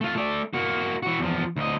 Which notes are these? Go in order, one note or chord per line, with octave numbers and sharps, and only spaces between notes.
A3 F4
A3 D5
A#3 F#4
E3 F#4
E2 F3
D2 D#5